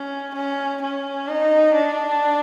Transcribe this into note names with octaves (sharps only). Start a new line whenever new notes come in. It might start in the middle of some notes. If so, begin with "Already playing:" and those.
Already playing: C#4
C#4
C#4
D#4
D4